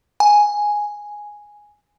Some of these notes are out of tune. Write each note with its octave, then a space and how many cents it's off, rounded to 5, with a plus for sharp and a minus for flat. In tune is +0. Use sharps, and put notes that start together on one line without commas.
G#5 +0